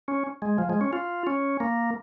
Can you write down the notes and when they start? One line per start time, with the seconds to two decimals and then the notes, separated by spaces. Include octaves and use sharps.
0.08 C#4
0.42 G#3
0.58 F3
0.70 G#3
0.81 C#4
0.93 F4
1.27 C#4
1.60 A#3